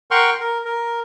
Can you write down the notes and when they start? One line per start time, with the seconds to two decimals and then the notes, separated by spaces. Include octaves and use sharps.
0.11 A#4 F#5 G5 C6 C#6 F6
0.40 A#4
0.65 A#4